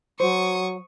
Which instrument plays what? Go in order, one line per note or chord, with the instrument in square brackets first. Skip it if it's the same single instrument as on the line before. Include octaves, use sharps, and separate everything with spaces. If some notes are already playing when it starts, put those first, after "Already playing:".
[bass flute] F#3 [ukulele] C5 [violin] C#6 D#6